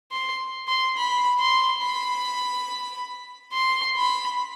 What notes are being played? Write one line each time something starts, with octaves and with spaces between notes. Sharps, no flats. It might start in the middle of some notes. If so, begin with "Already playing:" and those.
C6
C6
B5
C6
B5
C6
B5